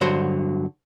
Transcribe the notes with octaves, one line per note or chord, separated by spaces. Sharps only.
G2 D3 F#3 F#4 C5